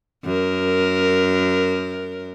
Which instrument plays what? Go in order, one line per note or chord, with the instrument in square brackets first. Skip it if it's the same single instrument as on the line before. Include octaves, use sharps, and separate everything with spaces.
[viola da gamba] F#2 A#4